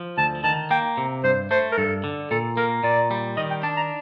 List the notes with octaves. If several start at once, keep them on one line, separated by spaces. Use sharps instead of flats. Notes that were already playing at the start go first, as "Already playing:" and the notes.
Already playing: F3
D2 A5
D#3 A5
A#3 G5
C3
G2 C5
A3 C5
A#4
G2 A4
D3
A#2 A4
A#3 A#4
A#2 D5
G3
D#3 D#5
G5
D4 A5
A#5